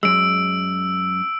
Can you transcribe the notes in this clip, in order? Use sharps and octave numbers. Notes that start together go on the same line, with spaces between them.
F#2 G#3 E6 D7